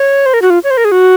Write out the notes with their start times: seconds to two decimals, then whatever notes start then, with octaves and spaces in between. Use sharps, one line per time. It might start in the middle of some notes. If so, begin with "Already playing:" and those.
Already playing: C#5
0.26 C5
0.34 A#4
0.42 F#4
0.50 F4
0.64 C#5
0.71 C5
0.77 A#4
0.85 G#4
0.92 F#4